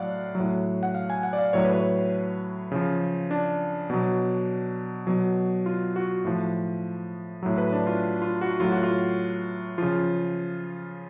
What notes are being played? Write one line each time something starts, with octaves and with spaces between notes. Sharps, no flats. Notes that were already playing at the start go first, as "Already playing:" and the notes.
Already playing: A2 F#3 D5 F5 F#5
F#3
A2
F#5
F5
G#5
F#5
D5
F5
A2 F#3 C#5
B4
C#5
C#3 F3
D4
B2 F#3
B2 F#3
F4
F#4
A2 F3
A2 F#3
B4
D4
F4
F4
F#4
A2 F#3 F4
F#4
F4
C#3 F3 F4